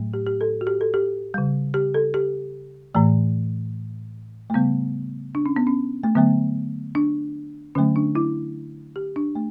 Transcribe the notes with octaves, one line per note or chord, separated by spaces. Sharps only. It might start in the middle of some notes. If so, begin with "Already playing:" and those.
Already playing: A2 F#3 A3
G4
G4
A4
F#4
G4
A4
G4
C#3 G3
G4
A4
G4
A2 E3 A3
A3
C#3 G3 B3
D4
C#4
B3
C#4
A3
D3 F#3 A3 B3
D4
D3 F#3 A3 C#4
D4
E4
G4
D4
A3